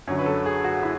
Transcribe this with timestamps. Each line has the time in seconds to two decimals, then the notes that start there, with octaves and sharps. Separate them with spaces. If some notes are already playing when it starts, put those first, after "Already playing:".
0.07 F#2 D3 F#3 C#5
0.18 B4
0.26 A4
0.46 G#4
0.64 F#4
0.83 E4